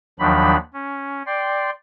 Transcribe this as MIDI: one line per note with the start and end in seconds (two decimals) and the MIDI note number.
0.19 0.57 39
0.19 0.57 51
0.19 0.57 53
0.19 0.57 54
0.19 0.57 62
0.19 0.57 83
0.74 1.23 61
1.26 1.70 74
1.26 1.70 79
1.26 1.70 84